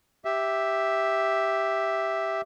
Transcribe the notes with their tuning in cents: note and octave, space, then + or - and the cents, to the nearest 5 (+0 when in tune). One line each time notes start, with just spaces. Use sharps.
G4 +0 E5 +0